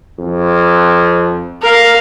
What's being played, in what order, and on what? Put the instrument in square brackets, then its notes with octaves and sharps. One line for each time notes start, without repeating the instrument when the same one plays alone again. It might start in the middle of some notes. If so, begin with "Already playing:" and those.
[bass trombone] F2
[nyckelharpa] A#4 F5